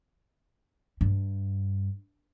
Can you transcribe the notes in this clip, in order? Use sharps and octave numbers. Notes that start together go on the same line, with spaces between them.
G2